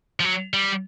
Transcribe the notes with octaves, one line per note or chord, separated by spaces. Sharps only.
F3
F#3
G3